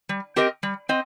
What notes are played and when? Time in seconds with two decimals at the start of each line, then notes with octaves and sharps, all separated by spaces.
0.09 G3
0.36 C4 G4 A#4 D#5
0.63 G3
0.89 C4 D#5